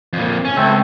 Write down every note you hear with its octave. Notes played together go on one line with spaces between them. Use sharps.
F2 A#2
C#4
C#2 A3 C4 A4